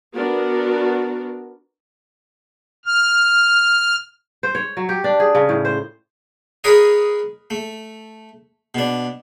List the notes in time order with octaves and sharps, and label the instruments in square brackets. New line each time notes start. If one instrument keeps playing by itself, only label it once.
[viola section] B3 D4 F#4 A#4
[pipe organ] F6
[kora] C5
C#5
F#3
G4
D4
G#4
C#3
A2
C5
[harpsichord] G#4 A#4 B4 C#5 D#5
A3
B2 D4